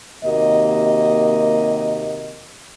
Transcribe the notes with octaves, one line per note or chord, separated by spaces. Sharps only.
D#2 C3 A#3 F#4 D#5